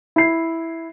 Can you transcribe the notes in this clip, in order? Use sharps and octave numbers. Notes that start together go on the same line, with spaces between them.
E4 C7